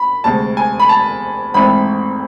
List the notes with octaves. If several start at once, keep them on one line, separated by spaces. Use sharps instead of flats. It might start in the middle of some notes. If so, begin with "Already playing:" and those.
Already playing: B5
D2 C3 G#3 A5
G#5
B5
A5
G#1 G#2 E3 A3 C4 B5